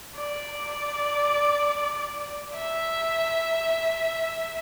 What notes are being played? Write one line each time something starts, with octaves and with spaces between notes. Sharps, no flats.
D5
E5